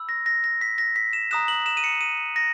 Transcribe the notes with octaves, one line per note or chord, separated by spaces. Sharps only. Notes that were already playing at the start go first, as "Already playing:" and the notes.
Already playing: B5 E6
A#6
A#6
A#6
B6
A#6
B6
E7
A#5 D#6 F#6 E7
F#7
E7
D#7
C#7
D#7
A#6